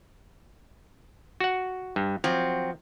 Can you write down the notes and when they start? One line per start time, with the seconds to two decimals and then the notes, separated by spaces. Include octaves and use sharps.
1.40 F#4 F#5
1.96 G2
2.24 F3 F#3 C4